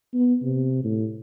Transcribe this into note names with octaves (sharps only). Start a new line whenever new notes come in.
B3
C3
A2